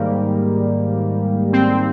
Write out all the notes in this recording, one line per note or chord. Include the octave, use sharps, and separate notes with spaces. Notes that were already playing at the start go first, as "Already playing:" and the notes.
Already playing: G#2 D#3 G3 A#3
C4